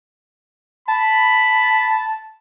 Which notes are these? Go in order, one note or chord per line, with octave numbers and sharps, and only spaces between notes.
A5 B5